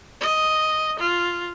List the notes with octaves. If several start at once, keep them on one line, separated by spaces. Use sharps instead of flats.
D#5
F4